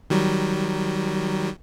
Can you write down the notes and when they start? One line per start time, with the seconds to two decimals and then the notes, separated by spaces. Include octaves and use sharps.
0.10 D#3 F#3 G3